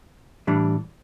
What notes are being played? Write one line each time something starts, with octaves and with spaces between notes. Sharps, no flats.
A2 E3 G3 D4